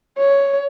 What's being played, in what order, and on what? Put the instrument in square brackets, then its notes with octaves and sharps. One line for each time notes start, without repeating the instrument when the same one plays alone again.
[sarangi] C#5